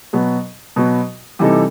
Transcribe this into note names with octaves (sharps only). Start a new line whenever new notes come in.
B2 F#3 B3
B2 F#3 B3
C3 E3 G3 D#4 A4